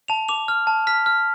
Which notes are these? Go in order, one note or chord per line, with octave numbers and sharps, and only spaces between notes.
A5 F7
D6 F7
F6
A5
F6 B6
F6